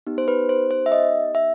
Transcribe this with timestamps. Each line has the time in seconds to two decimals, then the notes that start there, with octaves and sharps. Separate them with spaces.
0.07 B3 D#4 G4
0.18 C5
0.28 B4
0.49 C5
0.71 C5
0.86 E5
0.92 D#5
1.35 E5